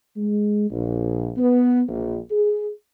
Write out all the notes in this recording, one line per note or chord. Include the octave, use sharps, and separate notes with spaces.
G#3
A#1
B3
A#1
G#4